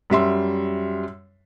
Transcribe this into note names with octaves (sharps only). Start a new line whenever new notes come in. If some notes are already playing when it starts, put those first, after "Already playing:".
F#2 G3 E5 C6